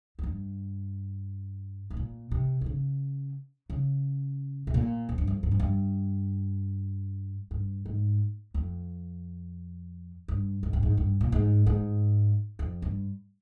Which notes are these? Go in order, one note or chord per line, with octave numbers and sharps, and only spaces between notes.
F2
G2
G#2
A#2
C3
C3
C#3
C#3
C3
A#2
F2
G2
F2
G2
F2
G2
G2
G#2
F2
G2
G#2
G2
G#2
G2
A#2
G#2
G#2
F2
G2